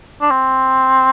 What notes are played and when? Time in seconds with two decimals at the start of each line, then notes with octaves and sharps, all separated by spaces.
0.21 D4
0.31 C4